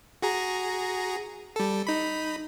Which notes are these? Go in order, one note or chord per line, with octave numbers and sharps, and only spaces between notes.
F#4 G#4 A#5
G3 A4
D#4 B5